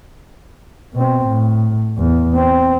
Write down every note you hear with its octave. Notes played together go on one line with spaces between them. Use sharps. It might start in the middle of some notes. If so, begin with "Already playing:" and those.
B2 C4
A2
E2
C4